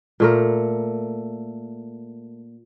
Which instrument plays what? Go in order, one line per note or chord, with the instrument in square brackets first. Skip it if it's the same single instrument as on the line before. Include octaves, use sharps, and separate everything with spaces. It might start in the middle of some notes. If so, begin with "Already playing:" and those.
[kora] A#2 A3 A#4